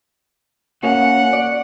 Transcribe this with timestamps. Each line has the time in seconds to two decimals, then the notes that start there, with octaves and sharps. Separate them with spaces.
0.83 A#3 C#4 F#4 F#5
1.33 D5